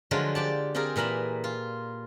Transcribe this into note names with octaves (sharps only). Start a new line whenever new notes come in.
D3 F3 F#3 G#3 F4 A#4
G4 D5 A5
C4 F4 G4 G#4 A#4
A#2 E3 A#4 E5 B5
F4